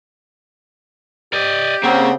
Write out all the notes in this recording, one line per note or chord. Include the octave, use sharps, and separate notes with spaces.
G4 D5 D#5
C#3 A#3 C4 F#5